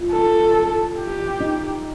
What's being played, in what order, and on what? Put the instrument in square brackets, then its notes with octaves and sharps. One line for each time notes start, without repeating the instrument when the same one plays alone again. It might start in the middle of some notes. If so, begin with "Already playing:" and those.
Already playing: [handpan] F4
[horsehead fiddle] A4
G4
[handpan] D#4